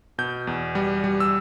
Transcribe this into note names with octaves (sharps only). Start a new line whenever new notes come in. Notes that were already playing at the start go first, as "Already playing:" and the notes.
B2 G6
E2
G3
G3
E6